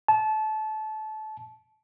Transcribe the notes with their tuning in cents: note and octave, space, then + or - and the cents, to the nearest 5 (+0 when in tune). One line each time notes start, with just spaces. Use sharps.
A5 -25